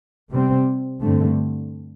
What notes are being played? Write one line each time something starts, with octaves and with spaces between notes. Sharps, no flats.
C3 G3 C4
G2 D3 A3 C4